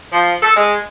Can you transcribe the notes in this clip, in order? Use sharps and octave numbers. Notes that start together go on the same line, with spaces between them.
F3
A4
G#3